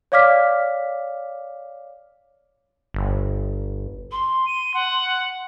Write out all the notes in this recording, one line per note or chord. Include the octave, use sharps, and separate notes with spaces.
C#5 D5 F5 D6 F6 B6
G1
C6
D#7
F#5